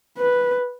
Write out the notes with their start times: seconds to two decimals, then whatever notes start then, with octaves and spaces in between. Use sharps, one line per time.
0.18 B4